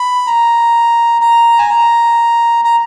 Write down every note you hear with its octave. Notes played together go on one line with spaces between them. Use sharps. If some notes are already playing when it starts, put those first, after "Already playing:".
Already playing: B5
A#5
A#5
G#5
A#5
A#5